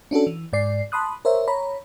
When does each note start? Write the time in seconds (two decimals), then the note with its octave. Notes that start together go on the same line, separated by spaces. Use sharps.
0.11 C#4 D4 F#4 A4
0.27 E3
0.53 G#2 D5 C7
0.92 A5 B5 C6 D#6 F#6
1.25 A#4 C5 C#5 E5
1.48 C#5 A#5 B5